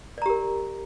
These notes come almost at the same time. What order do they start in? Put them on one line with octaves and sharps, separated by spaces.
D5 A#5 G4 A#4